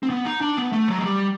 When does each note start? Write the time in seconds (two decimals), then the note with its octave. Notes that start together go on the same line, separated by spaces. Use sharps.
0.03 C4
0.10 B3
0.25 D#4
0.41 D4
0.57 B3
0.72 A3
0.88 F#3
0.98 G#3
1.04 G3